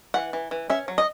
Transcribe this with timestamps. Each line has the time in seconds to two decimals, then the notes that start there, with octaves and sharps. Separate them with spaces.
0.14 E3 F#5
0.33 E3
0.51 E3
0.70 C#4 E5
0.88 F#3
0.98 D#5